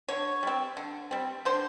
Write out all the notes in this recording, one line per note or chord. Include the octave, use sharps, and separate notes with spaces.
D3 C#5
G3 C4
D3
G3 C4
D3 C5